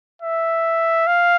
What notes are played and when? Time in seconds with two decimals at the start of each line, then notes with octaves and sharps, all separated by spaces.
0.22 E5
1.07 F5